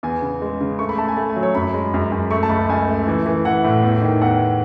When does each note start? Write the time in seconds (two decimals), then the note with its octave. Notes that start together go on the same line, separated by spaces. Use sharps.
0.03 E2 G#5
0.22 C#3
0.42 G#3
0.61 C#3
0.79 A3 C#6
0.89 B5
0.98 A3 A5
1.08 G#5
1.17 A3
1.30 G#5
1.36 F#3
1.43 C#5
1.55 F#2 B5
1.74 G#3
1.94 F#2
2.12 F#2
2.31 A3 C#6
2.43 A5
2.50 C#2 B5
2.69 C#2 G#5
2.88 A3
3.07 E3
3.26 E3
3.45 E3 F#5
3.64 A2
3.83 E2
4.02 D#3
4.21 E2 F#5